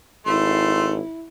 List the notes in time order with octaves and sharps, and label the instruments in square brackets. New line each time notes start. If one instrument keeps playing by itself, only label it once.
[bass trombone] G#1 [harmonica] A3 C6 [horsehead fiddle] E4